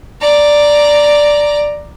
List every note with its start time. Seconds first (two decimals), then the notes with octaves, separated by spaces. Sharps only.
0.21 D5 A#5